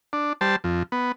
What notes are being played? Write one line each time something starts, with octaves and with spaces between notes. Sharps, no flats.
D4
G3 C5 A5
F2
B3